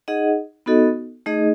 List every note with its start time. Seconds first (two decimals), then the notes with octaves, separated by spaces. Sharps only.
0.08 D#4 G#4 D#5 F#5
0.66 B3 D#4 F#4 A4 D#5
1.26 A3 D#4 G#4 D#5